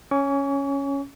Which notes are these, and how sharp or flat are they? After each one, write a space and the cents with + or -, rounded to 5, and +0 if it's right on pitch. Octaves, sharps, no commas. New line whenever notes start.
C#4 +0 C#6 +40